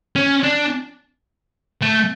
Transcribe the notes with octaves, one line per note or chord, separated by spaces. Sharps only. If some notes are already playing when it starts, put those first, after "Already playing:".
C#4
D4
A3